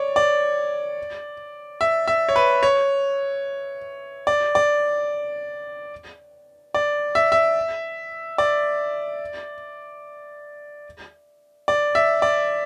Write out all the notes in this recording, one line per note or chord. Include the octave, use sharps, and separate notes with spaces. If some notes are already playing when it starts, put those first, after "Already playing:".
Already playing: C#5 D5
D5
E5
E5
C#5
B4
C#5
D5
D5
D5
E5
E5
D5
D5
E5
D5